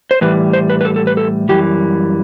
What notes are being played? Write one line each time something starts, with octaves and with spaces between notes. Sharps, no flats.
C5
A2 E3 G3 B4
C5
B4
B4
A4
A4
B4
A4
F#2 E3 G3 G4